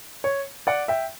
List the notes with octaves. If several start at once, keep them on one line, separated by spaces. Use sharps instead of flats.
C#5
D5 F#5
E5 G5